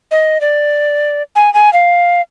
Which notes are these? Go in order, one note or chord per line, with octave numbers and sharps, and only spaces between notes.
D#5
D5
G#5
G#5
F5